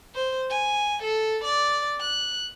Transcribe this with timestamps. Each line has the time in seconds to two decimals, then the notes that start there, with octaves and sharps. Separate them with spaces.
0.15 C5
0.50 G#5
1.03 A4
1.44 D5
2.01 F#6